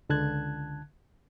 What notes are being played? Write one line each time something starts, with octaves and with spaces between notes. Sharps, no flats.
C#2 D3 A5 F#6 G#6